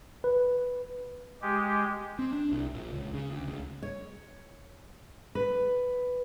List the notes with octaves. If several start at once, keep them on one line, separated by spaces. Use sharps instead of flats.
B4
G#3 G4
C4
D4
C2
A#1
C#2
C#3
D2
C#2
C#5
B4